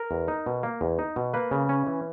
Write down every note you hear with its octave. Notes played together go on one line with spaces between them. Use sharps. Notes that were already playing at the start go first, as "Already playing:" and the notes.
Already playing: A#4
E2
D#4
B2
A#3
E2
D#4
B2
A#3 B4
C#3
C#4
E3